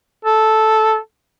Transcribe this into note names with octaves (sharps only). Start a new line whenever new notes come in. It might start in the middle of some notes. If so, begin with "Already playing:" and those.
A4